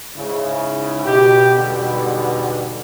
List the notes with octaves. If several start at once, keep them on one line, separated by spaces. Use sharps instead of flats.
G#2 C#3 E4
B2 G4
E2 G#2 B2 D3 G3 B3